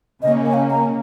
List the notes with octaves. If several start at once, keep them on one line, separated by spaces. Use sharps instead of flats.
C#3 A#3 C#4 D#5
G#5
F5
A#5